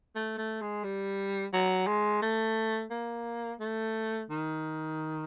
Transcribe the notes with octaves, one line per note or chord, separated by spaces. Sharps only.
A3
A3
G#3
G3
F#3
G#3
A3
A#3
A3
D#3